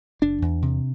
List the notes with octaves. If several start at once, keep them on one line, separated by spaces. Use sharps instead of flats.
F#1 D4
E2
C3